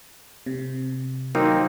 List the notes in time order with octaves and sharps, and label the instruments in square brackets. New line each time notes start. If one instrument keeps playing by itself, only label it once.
[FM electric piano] C3
[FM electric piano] D#3 F#3 [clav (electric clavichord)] A#3 C4 D#4